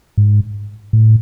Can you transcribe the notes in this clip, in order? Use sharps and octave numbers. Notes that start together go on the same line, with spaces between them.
G#2
A2